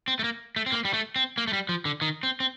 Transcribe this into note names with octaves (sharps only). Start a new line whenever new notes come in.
C4
A3
A#3
A3
C4
A#3
G3
A3
C4
A#3
A3
G3
F3
D3
D#3
C4
C4